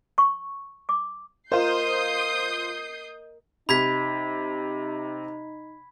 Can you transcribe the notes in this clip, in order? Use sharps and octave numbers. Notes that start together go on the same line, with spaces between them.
C#6
D6
F4 A#4 C5 D#5 D#6 G6 C7
C3 D#4 B5 G#6 B6